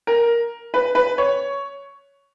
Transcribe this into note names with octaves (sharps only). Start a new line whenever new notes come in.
A#4
B4
B4
C#5